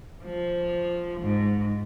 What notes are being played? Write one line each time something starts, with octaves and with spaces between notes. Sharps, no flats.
F3
G#2